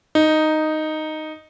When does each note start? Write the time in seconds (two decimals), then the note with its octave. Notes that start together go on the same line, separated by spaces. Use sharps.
0.15 D#4